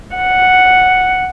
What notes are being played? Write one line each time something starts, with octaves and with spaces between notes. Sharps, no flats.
F#5